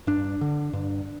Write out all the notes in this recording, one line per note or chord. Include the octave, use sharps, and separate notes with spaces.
G2 D4
D3
G2